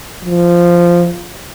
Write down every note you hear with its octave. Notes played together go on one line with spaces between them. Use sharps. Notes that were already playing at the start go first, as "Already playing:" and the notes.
F3